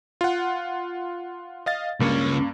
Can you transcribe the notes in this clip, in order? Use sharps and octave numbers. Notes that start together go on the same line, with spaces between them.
F4 F#5
D#5 F5 A6
C#2 G2 A#3 C#4